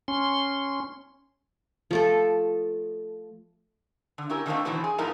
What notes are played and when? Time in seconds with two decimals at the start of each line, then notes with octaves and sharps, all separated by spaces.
0.08 C#4 C6
1.91 F3 A3 A4
4.18 D3
4.29 C#4 E4 G4 A#4
4.46 D3 D#3 F#3 A3 A#3 C4
4.65 B2 D#3 E3 F#3 A3 C4
4.84 G#4
4.98 G#2 F3 B3 D#4 E4 A#4